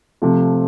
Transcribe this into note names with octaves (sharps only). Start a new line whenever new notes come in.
C3 F3 A3